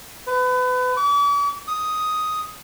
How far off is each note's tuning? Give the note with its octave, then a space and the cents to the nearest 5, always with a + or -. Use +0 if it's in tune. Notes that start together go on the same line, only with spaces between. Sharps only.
B4 +30
D6 -45
D#6 +5